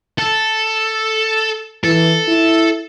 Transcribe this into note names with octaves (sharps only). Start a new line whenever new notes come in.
A4
E3 A4
E4